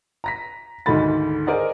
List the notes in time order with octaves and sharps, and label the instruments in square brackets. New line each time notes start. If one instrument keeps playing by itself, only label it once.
[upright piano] A#5 A#6 B6
D2 G#2 D#3 A3 B5 A6
G#4 A#4 C5 D5 D#5 F#5